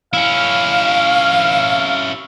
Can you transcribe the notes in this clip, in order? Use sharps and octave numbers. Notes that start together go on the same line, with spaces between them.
C#4 E4 F5